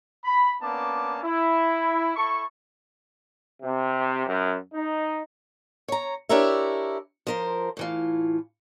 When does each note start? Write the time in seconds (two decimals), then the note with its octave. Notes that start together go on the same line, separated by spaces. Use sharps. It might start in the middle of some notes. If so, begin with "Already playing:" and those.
0.25 B5
0.61 A#3 B3 C#4 D4 A5 D6
1.24 E4
2.16 E4 A4 A5 C#6
3.63 C3
4.27 F#2
4.74 D#4
5.88 C#5 A#5
6.29 D4 E4 G4 A#4 C#5 E5
7.27 F3 A#4 C5
7.77 A2 E3 F4